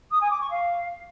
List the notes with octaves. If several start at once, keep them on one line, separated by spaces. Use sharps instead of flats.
D#6
G#5
D6
C#6
F5